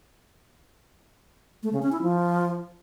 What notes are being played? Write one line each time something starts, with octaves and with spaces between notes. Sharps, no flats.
A3
C#3
C#4
E4
F3